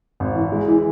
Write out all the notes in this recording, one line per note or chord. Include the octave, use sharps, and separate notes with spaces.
G#1
E3
G#3
E3